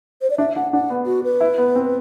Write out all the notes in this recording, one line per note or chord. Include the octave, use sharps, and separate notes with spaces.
C5
D5
D4 E5
D4 F#5
D4 F#5
B3
F#4
B4
E4
B3
C4